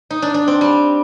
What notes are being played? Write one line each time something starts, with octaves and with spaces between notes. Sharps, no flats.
D#4
D4
D4
C4
G3